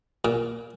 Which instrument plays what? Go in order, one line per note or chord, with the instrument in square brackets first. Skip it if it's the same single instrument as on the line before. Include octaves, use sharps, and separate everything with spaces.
[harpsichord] A#2